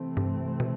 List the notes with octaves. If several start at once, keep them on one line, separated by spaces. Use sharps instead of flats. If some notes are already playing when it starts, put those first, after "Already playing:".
Already playing: C3 E3 A3 C4
G2
B2